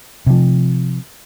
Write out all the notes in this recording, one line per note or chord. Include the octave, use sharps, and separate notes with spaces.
C3 F3